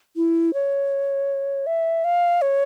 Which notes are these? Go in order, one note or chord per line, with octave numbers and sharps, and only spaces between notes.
E4
C#5
E5
F5
C#5